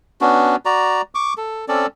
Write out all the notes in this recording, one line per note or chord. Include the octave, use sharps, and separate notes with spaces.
B3 C#4 D4 F#4
F#4 D5 A#5
C#6 D6
A4
C4 C#4 A4 D5